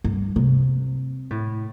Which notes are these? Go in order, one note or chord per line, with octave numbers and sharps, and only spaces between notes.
G2
C3
A2